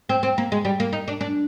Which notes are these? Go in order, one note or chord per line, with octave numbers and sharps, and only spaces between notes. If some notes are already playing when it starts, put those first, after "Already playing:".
C4
C4
A#3
G#3
G3
A#3
D#4
D4
D4